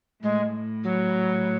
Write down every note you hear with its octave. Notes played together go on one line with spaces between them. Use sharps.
A2 G#3
F#3